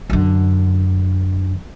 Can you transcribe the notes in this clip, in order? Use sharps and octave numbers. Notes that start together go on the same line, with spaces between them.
F#2 D3